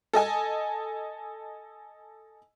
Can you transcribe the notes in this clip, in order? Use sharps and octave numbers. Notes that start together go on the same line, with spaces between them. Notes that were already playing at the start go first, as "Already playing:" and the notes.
A4 D#5 G#5